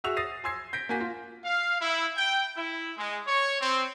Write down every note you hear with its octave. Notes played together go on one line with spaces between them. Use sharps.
F#4 G#4 E5 C#6 E6 F7
D#6 A6 A#6 C7 D#7
G#5 C6 E6 G#6 C7
G6 A#6 B6 D7
A#3 F#4 G#5 B6
F4
F5
E4
G5
E4
G#3
C#5
C4